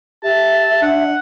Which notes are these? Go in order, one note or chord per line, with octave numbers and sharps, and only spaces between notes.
G4 E5 A5
D4 F#5